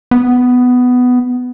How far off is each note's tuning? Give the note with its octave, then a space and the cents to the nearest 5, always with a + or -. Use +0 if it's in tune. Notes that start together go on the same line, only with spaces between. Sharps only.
B3 +10